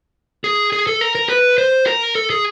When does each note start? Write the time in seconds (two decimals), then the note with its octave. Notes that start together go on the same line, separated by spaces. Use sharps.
0.44 G#4
0.73 G#4
0.87 A4
1.01 A#4
1.15 A#4
1.29 B4
1.58 C5
1.87 A#4
2.15 A4
2.30 G#4